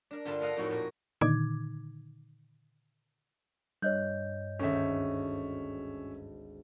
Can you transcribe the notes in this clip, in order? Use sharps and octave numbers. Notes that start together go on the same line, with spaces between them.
D4 A#4
G2 D3 F4 A5 B5
A4 A#4 D#5 F5 F#5
F2 A2 D#4 F#4 A4
A#2 A#4
A#2 D3 D#3 D#4 D6 G#6
G2 C#5 D#5 F#6 G6
G#1 D2 C#4 E5